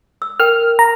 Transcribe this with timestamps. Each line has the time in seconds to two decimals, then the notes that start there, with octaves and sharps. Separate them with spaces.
0.22 E6
0.40 A#4 G5 F6
0.79 A#5